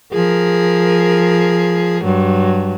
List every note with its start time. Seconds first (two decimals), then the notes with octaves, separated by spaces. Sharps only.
0.12 F3 G#4 A#4
2.04 G2 F#3